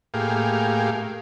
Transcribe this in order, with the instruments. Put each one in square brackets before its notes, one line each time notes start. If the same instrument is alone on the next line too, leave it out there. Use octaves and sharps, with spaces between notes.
[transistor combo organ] A2 A#3 G4 G#4 F5